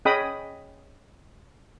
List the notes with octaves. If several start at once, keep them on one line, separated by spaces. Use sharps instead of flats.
C#4 G#4 D#5 G5 B5 D#6